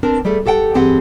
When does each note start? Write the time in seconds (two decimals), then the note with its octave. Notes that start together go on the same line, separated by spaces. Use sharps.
0.03 C4 D4 A#4
0.25 G3 A3 G#4 A4
0.46 G4 A4 F#5 G5
0.74 G2 E3 C4 G4 G#4 F#5